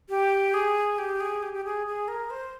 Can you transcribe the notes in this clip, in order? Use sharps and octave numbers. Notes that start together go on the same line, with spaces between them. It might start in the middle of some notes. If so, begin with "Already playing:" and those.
G4
G#4
G4
G#4
G4
G4
G#4
G#4
A#4
C5